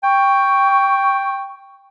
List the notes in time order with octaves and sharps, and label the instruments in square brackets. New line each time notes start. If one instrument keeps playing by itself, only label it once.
[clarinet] G5 [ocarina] C#6